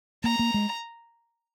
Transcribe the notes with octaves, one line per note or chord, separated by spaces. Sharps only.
A#3 A#5
A#3
G#3